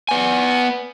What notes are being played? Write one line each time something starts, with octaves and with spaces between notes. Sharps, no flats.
B3 G#5